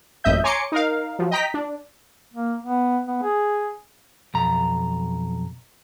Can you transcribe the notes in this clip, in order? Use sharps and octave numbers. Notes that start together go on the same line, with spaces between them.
A1 F#2 A#2 D#5 E5 G6
C#5 G#5 A#5 C6 D6 C#7
D#4 A#4 F5
F3 F#3
D#5 G5 A#5 B6
D4
A#3
B3
B3
G#4
B1 F2 A#5